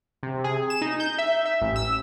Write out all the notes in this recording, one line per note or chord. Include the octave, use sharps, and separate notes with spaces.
C3
G#4
E7
D#4
G6
E5
E5
A1
E6